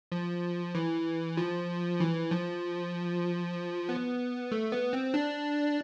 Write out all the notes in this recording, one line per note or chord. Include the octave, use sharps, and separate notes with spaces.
F3
E3
F3
E3
F3
B3
A3
B3
C4
D4